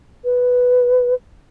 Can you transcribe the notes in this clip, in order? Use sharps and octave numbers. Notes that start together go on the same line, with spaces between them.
B4